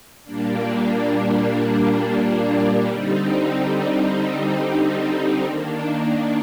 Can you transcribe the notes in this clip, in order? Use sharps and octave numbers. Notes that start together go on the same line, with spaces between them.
A#2 G3 A#3 D4
D3 G3 C4 D#4
D#3 A#3 D4